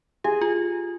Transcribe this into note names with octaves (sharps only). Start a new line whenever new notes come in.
G4 G#4
F4